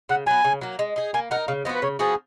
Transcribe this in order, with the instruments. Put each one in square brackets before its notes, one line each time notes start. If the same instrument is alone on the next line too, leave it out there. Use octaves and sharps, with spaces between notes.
[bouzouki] C#3 [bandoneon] F#5
[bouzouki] F#3 B3 [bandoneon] G#5
[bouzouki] C#3
F#3 A#3
G#3
D#4 G#4
[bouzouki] A#3 [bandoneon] G#5
[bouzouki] D#4 A#4 [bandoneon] F#5
[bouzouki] C#3 [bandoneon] F5
[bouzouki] F3 B3 F#4 [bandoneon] D#5
[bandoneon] B4
[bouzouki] C#3 [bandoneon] C#5
[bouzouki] F3 B3 F#4 [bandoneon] G#4